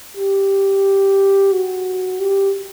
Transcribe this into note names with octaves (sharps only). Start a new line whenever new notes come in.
G4
F#4
G4